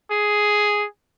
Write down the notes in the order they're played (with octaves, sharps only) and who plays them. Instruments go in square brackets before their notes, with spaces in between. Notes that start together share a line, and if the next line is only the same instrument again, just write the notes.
[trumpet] G#4